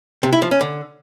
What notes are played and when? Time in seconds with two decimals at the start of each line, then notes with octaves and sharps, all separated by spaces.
0.23 C3
0.33 E4
0.42 F3
0.51 C#4
0.61 D3